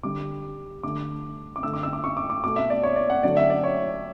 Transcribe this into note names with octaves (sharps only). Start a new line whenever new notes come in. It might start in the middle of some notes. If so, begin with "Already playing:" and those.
D3 G3 D6
D3 A3 D6
D6
D3 A3 E6
D6
E6
D6
C#6
D6
D6
B2 A3 D6
E5
D5
C#5
D5
F#5
D3 F#3 A3 D5
E5
D5
C#5